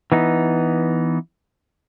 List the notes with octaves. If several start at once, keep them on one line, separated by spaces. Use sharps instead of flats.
E3 B3 D#4